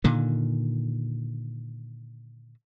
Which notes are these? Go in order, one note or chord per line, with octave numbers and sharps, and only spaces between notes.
A#2 D3 D#3